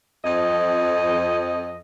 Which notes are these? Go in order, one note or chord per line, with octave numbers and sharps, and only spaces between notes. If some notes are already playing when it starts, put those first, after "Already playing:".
F2 D#5